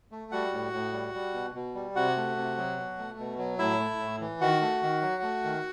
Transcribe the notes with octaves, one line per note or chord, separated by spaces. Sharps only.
A3
G3 F#4 F#5
A2
A2
G3
G3
B2
B2
G3
C3 F#4 F#5
A3
C3
F#3
B2
A3
B2
F#3
A2 E4 E5
A3
A2
E3
D#3 F#4 F#5
A3
D#3
F#3
A3
D#3